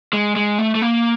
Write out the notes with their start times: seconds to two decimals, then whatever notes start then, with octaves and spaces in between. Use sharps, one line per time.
0.13 G#3
0.36 G#3
0.59 A3
0.75 A3
0.82 A#3